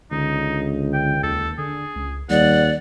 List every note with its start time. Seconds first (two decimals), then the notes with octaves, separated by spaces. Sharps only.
0.12 C#2 D3 D#4
0.94 G5
1.24 D#2 A4
1.58 D3 G#4
1.96 C#2
2.30 D#2 G3 D5 F#5